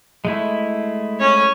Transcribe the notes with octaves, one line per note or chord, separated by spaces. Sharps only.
G#3 A3 E4
C#4 C#5